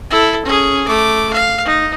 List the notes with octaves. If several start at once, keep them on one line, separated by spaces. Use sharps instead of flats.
E4 A4
C#4 G#4
A3 D6
F5
D#4